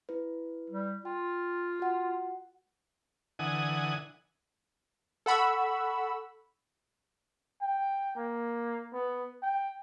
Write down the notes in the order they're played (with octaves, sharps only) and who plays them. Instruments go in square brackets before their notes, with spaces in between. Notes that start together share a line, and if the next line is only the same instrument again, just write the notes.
[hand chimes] E4 B4
[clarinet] G3
[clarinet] F4 [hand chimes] G5
[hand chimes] F#4 F#5
[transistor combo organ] D3 E3 F#5 G#5 D#6
[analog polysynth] A4 F#5 B5 C#6 E6
[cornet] G5
A#3
B3
G5